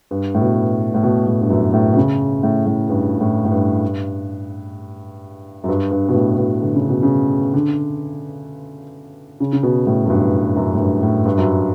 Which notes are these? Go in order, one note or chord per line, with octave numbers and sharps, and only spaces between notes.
G2
A2
B2
A2
B2
A2
G2
F#2
A2
B2
C#3
A2
A2
G2
A2
A2
G2
F#2
G2
G2
B2
A2
B2
D3
C#3
B2
C#3
D3
C#3
C#3
B2
A2
F#2
G2
F#2
A2
G2
A2
G2
F#2